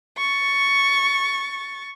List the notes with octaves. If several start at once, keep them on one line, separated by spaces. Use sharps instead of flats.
C#6 A6